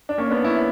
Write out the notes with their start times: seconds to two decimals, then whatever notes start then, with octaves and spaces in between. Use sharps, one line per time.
0.09 D4
0.18 A#3 C#4
0.31 B3 D4
0.44 C#4 E4